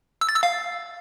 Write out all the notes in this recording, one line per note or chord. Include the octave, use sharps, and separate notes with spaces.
E6
A6
E6
F5